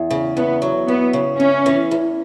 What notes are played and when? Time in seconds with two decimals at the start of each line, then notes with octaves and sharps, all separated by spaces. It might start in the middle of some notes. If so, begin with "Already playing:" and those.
Already playing: E2
0.11 C#3
0.36 E2 B3
0.62 F#3
0.88 E2 B3
1.13 C#3
1.39 E2 C#4
1.66 E3
1.91 E2